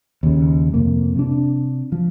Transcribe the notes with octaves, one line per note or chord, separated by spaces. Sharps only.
D#2 C#3
F2 C3 A#3
C3 D4
F3